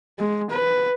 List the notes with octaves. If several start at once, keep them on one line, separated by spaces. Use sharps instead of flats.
G#3
B4